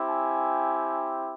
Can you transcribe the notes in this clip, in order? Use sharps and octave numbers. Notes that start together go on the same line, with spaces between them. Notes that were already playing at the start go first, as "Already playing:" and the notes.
Already playing: C4 E4 G4
G#5